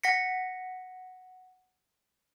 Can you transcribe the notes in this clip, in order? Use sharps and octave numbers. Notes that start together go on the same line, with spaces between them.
F#5 A#6 B6 C#7